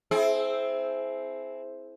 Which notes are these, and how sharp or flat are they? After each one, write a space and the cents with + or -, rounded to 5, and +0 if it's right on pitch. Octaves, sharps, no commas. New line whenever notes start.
C4 +0 E4 +0 G#4 +35